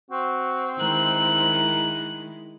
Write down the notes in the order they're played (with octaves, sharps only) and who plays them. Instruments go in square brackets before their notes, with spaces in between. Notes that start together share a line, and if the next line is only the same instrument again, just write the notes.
[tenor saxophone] C4 [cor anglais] F#4
[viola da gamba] D#3 G#3 E4 [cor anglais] A#4 [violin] F#6